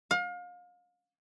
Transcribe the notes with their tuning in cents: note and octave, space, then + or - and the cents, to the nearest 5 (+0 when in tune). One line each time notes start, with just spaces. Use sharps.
F5 +35